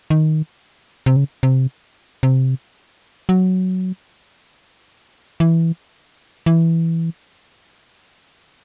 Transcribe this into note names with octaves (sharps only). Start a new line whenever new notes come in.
D#3
C3
C#3
C3
C3
F#3
E3
E3